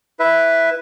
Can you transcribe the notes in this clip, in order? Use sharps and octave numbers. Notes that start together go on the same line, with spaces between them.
E4 B4 E5